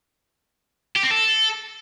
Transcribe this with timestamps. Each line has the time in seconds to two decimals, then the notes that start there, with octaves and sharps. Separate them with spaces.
0.96 G4
1.03 C4
1.11 A4